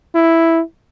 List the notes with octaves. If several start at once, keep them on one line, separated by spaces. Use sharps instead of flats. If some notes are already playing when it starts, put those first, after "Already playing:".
E4